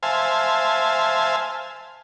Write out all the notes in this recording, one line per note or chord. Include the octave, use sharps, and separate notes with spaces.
C5 E5 F5 G#5 A5